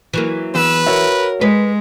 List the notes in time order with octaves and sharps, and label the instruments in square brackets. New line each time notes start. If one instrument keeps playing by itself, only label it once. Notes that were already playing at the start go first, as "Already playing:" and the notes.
[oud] E3 F#3 A#3
[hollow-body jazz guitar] E2 [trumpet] B4 [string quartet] E6
[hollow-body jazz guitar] F#4 C#5 E5 [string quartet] A#4
[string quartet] G#3 [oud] B4